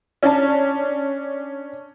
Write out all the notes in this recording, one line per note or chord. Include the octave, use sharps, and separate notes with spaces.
C#4 D4 A5